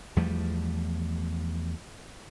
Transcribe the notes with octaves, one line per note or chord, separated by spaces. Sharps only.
E2 F3 G3 A3